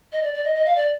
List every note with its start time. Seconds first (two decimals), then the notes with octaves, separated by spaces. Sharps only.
0.12 D#5
0.23 D5
0.34 D5
0.45 D#5
0.55 D#5
0.66 F5
0.76 D5